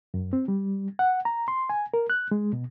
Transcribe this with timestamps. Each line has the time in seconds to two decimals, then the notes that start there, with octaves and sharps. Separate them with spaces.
0.14 F#2
0.33 C4
0.48 G3
0.99 F#5
1.25 A#5
1.48 C6
1.70 G#5
1.94 A#4
2.10 F#6
2.31 G#3
2.53 B2